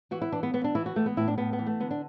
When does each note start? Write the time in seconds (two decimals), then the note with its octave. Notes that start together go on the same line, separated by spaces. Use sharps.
0.11 E3 F#4
0.22 E4
0.32 E3 D4
0.43 B3
0.53 E3 B3
0.64 D4
0.75 E3 E4
0.86 F#4
0.96 E3 A3
1.06 B3
1.17 A2 E4
1.28 D4
1.38 A2 B3
1.53 B3
1.59 E3
1.66 A3
1.80 D3 B3
1.91 D4